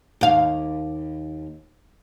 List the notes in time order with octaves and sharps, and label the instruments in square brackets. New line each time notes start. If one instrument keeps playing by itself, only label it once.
[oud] D#2 F5